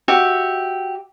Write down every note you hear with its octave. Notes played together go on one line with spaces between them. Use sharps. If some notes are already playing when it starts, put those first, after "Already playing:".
F#4 G4 E5